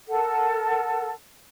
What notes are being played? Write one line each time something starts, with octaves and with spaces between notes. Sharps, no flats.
A4 A#4 F#5